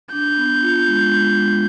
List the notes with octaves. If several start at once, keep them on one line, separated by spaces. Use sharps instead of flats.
D4 G6
B3
F4
G#3
G#3
G#3